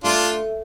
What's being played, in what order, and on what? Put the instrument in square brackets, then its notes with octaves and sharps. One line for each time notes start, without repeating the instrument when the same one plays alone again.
[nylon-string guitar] A3 [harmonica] D4 F4